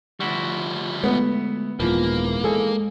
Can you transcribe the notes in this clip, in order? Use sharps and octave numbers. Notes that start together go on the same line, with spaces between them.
D2 F3 G3 E4 F#4
G#3 A3 B3
D#1 G#2 E3 F3 A#3 B3
G#3 G#4 A4